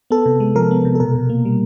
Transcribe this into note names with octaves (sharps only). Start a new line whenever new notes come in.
B3 A4
C3
G#3
F3 A#4
B3
C3
A4
B2 A#4
B2
A#3
G3